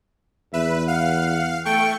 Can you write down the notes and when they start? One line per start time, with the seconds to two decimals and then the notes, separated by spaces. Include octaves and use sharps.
0.54 E2 B4 E5
0.88 F5 F#5
1.65 A3 G5 C#6